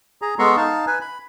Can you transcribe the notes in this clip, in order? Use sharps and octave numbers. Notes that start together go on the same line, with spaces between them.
G#4 A#5
G#3 B3 A4 A#5 C6 C#6
D#4 F5 A5
B4 G#5
B5